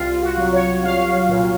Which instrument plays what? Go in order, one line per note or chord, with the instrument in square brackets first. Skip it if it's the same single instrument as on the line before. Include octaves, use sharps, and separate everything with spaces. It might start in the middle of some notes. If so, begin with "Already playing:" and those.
Already playing: [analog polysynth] C2 F4
F#4
F#3
C#5
C2 F5
A#2